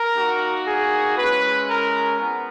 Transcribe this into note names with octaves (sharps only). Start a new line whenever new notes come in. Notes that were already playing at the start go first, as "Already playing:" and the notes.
Already playing: A#4
A#3 D#4 F#4
G#4
G#3 C#4 E4 B4
A#4
B3